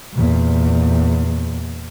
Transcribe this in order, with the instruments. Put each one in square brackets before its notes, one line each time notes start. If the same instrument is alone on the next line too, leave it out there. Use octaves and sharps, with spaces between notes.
[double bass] E2 A#2